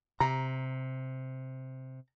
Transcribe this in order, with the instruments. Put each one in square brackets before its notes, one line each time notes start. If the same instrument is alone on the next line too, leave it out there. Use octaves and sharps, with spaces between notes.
[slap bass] C3 [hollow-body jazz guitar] A#5